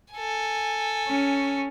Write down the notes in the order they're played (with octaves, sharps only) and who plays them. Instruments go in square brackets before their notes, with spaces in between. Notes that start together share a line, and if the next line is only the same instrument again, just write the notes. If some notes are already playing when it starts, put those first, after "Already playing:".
[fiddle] A4 G#5
[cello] C#4